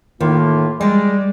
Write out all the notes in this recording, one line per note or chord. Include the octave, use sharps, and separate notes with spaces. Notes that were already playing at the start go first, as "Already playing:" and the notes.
A2 D#3 A#3 F4
G3 G#3 D5